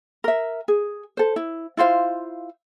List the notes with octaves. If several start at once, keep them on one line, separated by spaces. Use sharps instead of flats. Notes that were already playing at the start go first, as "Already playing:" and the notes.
A#4 E5
G#4
A4 C5
E4
E4 F4 C5 F5